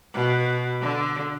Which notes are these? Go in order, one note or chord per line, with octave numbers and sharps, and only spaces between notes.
B2
D3